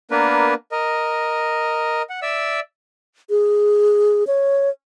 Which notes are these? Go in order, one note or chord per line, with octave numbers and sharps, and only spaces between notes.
A#3 B3 D4 A#4 B4
A#4 D#5
F#5
D5 E5 E6
G#4
C#5